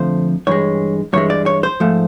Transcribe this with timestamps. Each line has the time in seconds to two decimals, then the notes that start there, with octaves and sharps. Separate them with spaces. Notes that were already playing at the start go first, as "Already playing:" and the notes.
Already playing: F2 D3 F3 A3 C5
0.47 G2 E3 G#3 C#5
1.13 G2 E3 G#3 C#5
1.30 D5
1.46 C#5
1.63 C5
1.80 G#2 F3 A3